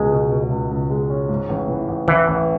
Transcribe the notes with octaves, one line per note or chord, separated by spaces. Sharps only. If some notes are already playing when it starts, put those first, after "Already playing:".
Already playing: C#2 B2 G#3
B2
B2
C#2
C#2
G#3
C#4
G#2
A1
E3
A1
A1 E3
A1